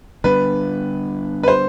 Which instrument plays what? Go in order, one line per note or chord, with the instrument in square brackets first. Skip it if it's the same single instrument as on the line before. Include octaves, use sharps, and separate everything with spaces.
[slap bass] D3 G3 B3 D4 [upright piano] B4
[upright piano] B4
C5